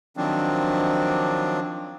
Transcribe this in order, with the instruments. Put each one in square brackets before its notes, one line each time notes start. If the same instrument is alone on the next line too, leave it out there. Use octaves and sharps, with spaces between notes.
[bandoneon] D#3 F3 F#3 C4 D4